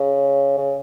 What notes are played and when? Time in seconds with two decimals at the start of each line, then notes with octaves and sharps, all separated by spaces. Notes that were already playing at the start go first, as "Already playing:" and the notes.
Already playing: C#3
0.58 C#3